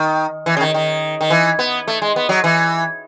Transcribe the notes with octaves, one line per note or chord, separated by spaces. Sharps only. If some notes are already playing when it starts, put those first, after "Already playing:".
Already playing: D#3
E3
C#3
D#3
D#3
D#3
E3
B3
A3
G#3
B3
F#3
E3